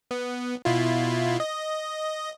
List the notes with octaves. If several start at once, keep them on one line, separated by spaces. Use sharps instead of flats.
B3
B2 E4 F4
D#5